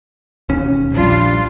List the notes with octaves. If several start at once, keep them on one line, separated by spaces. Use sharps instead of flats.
E1 D#2 C#4
A#1 G3 D4 F4